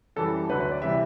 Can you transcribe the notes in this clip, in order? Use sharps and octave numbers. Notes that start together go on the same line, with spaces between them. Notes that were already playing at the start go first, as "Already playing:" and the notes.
F#2 E3 G3 A4
D2 D3 F#3 B4
B4
D5
C3 E3 G3 E5